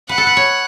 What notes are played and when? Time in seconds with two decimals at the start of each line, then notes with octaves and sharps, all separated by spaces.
0.09 B4 F#5
0.18 A4
0.27 B4
0.37 C#5